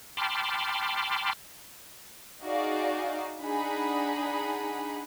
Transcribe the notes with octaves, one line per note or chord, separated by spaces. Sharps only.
G5 A5 B5 C6 D6 F6
D#4 F#4 G#4 D5 D#5 F5
D4 D#4 G#4 F#5 B5